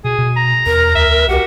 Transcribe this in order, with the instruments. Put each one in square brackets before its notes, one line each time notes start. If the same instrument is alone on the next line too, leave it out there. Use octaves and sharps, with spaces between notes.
[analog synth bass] B2 [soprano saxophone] G#4
[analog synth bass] B2
[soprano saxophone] A#5
[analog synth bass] E2 [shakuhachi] A#4
[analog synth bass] D2 [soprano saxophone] E5
[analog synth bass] C2 [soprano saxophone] F#4 [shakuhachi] G4